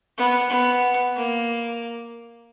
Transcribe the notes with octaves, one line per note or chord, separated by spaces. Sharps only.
B3
B3
A#3